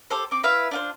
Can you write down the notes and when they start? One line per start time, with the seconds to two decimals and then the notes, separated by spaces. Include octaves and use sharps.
0.10 G4 A4 C5
0.31 C4 D6
0.44 E4 B4 E5 F5
0.71 D4 F4 C5